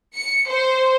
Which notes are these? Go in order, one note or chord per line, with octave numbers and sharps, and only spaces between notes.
C#7
C5